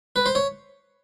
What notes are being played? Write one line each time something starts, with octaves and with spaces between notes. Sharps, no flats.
B4
C5
C#5